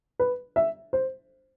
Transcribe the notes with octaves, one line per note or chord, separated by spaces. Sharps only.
B4
E5
C5